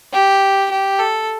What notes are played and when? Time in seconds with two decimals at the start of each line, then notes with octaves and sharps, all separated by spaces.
0.13 G4
0.71 G4
0.99 A4